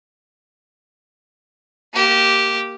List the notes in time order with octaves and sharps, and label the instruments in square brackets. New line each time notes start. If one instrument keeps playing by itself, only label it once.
[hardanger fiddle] A#3 G4